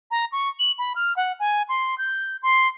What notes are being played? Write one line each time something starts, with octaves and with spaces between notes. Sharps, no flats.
A#5
C#6
F#7
B5
F6
F#5
G#5
C6
G6
C6